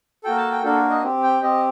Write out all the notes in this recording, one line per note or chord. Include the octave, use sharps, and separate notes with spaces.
A#3 F#4 A4 G5
A5
G5
A#3 D4 F#4 A4
D#5
C4 G4
G5
C4 G4 D#5